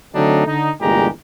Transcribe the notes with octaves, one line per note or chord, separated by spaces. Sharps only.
D3 F#3 A3 C4 D4 D#4
D3 D#4
G1 E2 A#2 G#3 G4 A#5